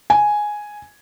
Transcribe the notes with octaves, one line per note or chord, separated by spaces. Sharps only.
G#5